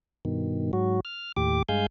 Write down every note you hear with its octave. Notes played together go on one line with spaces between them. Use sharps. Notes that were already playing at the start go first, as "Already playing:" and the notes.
G2 B2 D#3
G#2 F#3 F#4
F6
D#2 A2 G4 D6
G2 G#3 F5 G#5 G6